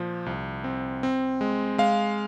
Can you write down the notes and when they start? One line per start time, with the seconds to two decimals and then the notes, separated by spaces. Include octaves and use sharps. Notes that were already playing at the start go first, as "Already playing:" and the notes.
Already playing: A#2 F3
0.26 C2
0.64 C4
1.03 C4
1.41 G#3
1.78 G#3 F5